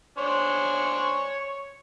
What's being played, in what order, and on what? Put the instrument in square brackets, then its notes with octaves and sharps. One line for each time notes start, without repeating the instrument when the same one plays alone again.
[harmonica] D4 C5 G#5 [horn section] C#5